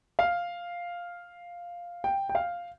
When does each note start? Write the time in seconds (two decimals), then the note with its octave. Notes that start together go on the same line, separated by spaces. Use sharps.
0.19 F5
2.04 G5
2.29 G5
2.35 F5